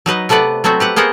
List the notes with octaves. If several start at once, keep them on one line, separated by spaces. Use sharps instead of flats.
F#3 D#4 B4 D#5
C3 A3 B3 B4 D5 F#5
F#3 A3 B3 C4 F#4 E5
G4 B4 F#5
A#3 B3 G#4 A#4 C5 F#5